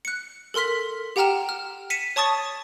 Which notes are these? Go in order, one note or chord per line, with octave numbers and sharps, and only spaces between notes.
F#6 C#7
A4 A#4 C6 F6 B6
G4 F#5 G5 A#5 F6 E7
F6
B6 C#7 D#7 E7
C#5 A5 C#6 D#6 A6